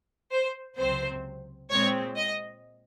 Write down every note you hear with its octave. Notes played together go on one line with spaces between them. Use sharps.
C5
C#2 C3 F#3 C4 C5
A#2 G#3 C4 C#5
D#5